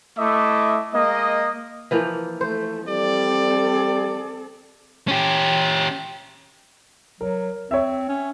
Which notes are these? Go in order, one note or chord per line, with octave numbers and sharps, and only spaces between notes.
A3 E4 D#5 E5 D6
G#3 A#3 D#5
E3 F3 A#3
A3 C5
G3 C4 A4 D5
C#4 G4
F#3 A#4
C4 C#5 E5
C#4